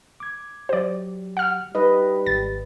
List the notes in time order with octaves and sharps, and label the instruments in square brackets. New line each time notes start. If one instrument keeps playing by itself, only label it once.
[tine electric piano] D6 G#6
[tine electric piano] F#3 G4 [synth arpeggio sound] C5 D5
[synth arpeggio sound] F#5 F6
[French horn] G3 [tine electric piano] D#4 [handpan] B4 D#5
[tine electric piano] G#1 [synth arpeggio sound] A6